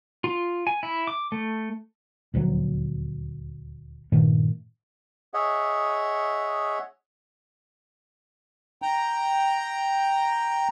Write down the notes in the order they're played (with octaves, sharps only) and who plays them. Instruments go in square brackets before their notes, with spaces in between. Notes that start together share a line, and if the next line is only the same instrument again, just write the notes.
[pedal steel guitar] F4
G#5
E4
D6
A3
[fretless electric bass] D#1 D2 F3 F#3
G2 A#2 D#3 A3
[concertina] G#4 C#5 D#5 E5 F#5
[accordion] G5 A#5